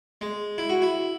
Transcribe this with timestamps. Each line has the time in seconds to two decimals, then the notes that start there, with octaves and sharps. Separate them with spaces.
0.21 G#3
0.58 E4
0.69 F#4
0.82 E4